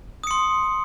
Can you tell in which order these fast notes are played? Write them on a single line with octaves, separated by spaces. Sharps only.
D#6 C#7 C6